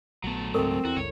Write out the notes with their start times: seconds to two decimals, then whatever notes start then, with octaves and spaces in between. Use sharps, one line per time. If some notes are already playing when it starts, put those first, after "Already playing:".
0.24 A#1 F#3 A3 B3
0.54 C#2 G#2 C4 A4 A#4 C#6
0.85 E2 E4 F#4
0.97 F#1 C#2 G2 C#5